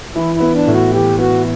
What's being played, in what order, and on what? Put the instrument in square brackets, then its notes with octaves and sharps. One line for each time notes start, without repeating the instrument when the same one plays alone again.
[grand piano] E3 [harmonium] E4
[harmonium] E4
[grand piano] B3
[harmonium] D4
[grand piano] A2
[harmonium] F#4
[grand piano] E3 [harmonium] G4
[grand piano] B3 [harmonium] F#4